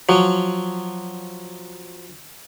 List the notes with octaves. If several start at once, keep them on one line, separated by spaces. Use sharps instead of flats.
F3 F#3